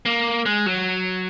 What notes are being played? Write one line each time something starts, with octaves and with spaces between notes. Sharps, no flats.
A#3
G#3
F#3